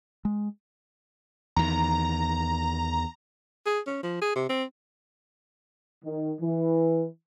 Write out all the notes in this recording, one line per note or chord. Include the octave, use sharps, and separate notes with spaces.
G#3
E2 D#3 A#5
G#4
C#4
F3
G#4
C3
C4
D#3
E3